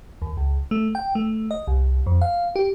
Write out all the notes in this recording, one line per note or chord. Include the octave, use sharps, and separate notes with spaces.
D#2
C#2
A3
G5
A3
D#5
C2
F2
F5
G4